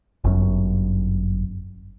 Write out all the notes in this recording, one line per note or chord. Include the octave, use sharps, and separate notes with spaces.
G1 F#2